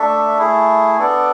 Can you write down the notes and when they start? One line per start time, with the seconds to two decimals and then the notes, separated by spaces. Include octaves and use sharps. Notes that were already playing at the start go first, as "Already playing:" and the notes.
Already playing: A3 D4 A4 E5
0.38 A3 E4 G#4
0.98 B3 D4 A4 D5